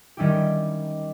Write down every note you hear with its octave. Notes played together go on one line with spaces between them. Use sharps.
D#3 G3 C#4 E4 G4